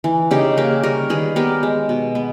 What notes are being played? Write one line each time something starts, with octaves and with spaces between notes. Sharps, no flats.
E3
C#3 D#4 G4
A#3 G4 A#4
G3 A#4 C#5
D#3 G#4 B4
B3 G4 A#4
G#3
B2
B3